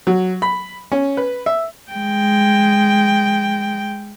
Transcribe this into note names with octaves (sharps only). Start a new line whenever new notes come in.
F#3
B5
C#4
B4
E5
G#3 G5